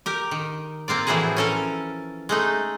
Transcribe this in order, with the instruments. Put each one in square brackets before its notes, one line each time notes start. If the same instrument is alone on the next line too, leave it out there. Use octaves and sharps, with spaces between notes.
[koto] G4 A#4
D#3
A#3 C4 F4 D5
A2 E3 F3 E4 F#4 G#4
C#4 A4 A#4
G#3 A3 D#4